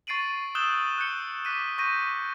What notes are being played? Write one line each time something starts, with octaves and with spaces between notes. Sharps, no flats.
C#6 A6 C7 D7 D#7 F#7
D#6 E6 F#6 G6 E7 G7
F#6 G6 C#7 G7
D6 F#6 B6 D#7
C#6 G6 A#6 D#7